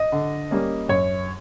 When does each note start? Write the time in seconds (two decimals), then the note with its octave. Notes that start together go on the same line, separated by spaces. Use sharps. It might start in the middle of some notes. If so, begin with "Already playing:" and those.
Already playing: D#5
0.12 D3
0.51 G3 A#3 C#4
0.89 F#2 C#5